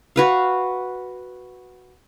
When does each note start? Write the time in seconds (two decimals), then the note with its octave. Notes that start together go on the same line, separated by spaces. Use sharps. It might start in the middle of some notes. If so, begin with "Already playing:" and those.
0.16 F#4 B4 F5